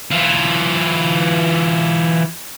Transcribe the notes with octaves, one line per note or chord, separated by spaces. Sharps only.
E3 F4